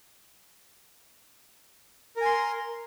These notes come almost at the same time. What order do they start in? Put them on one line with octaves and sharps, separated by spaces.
A#4 G#5 C6